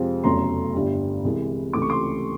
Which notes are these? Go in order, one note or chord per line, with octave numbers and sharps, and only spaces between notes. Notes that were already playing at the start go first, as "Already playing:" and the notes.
Already playing: F2 C3 F3 G#3
F1 E2 C#3 F#3 A3 A#5 C6
G1 G2 D3 G3
C2 C3 E3 G#3
C#2 C3 E3 A3 D6
C#6
C6 D6